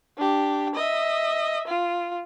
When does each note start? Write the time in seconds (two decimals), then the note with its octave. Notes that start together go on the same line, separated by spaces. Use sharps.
0.17 D4 G4
0.75 D#5 E5
1.67 F4